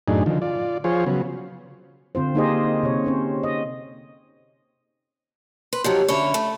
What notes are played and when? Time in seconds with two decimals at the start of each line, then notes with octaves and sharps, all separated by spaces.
0.08 F#2 A2 D4 D#4 G#4
0.26 D3 D#3 F3
0.42 F4 D5
0.84 F3 F4 G#4 C5 C#5
1.06 C#3 F#3 B3
2.15 D3 C4 F4 C5
2.35 A#3 D#4 G4 G#4 C5 D#5
2.83 C3 C#5
3.04 C4 C#4 C5
3.43 D#5
5.73 B4 C6
5.84 D#3 F3 F#3 G4 C#5
6.08 D3 C#4 C#5 E5 B5
6.34 A3